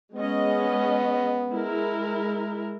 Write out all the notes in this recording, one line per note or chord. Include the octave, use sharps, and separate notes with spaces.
G#3 B3 C#4 D#5
G#3 E4 A#4